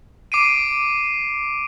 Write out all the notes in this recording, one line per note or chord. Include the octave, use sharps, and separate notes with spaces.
D6 C7 D7 D#7